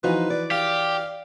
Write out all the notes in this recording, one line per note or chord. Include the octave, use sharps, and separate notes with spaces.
E3 F3 D#4 F#4 B4
D5
G4 F5